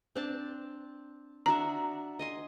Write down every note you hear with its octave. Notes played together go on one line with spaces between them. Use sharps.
C4 D4 A5
D4 F#4 E5 A#5
D#5 G#5 C6